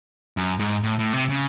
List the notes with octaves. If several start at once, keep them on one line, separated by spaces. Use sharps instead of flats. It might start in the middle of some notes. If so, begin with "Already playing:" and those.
F#2
G#2
A2
A2
C3
C#3